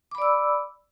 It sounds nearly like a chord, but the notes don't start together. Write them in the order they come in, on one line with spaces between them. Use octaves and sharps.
D6 B5 D5 E6